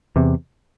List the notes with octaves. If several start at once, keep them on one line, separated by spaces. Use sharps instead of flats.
E2 C3